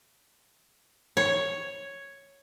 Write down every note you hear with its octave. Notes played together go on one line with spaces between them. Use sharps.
C#5